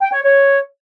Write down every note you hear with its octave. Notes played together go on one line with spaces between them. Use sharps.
G5
C#5
C#5